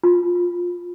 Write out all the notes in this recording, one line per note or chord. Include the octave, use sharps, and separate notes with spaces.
F4